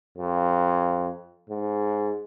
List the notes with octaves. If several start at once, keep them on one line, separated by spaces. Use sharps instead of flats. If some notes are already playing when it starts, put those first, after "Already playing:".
F2
G#2